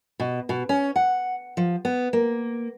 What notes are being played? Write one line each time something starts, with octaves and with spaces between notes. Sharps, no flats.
B2
B2
C#4
F#5
F3
B3
A#3